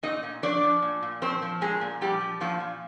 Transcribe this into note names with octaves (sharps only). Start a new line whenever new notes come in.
A#2 D#4 D#5
A#2
F3 D4 D5
F3
A#2
A#2
F3 C4 C5
F3
A#2 G#3 G#4
A#2
F3 G3 G4
F3
A#2 F3 F4
A#2